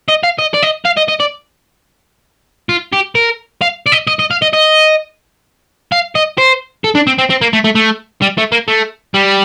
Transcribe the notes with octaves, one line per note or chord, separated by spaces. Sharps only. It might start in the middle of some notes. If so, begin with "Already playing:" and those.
D#5
F5
D#5
D5
D#5
F5
D#5
D#5
D5
F4
G4
A#4
F5
D5
D#5
D#5
D#5
F5
D#5
D#5
F5
D#5
C5
A4
D4
C4
C4
C4
A#3
A3
A3
A3
G3
A3
A#3
A3
G3